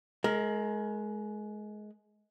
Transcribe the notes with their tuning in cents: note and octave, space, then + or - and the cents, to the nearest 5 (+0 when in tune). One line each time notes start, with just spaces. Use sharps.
G#3 +25 A#4 +0